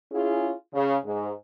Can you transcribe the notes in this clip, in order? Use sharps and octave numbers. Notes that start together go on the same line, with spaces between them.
C#4 E4 F4 G#4
C#3
G#2